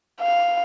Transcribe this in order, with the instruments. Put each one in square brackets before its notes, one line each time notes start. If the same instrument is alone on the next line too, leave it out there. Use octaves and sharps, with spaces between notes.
[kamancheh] F5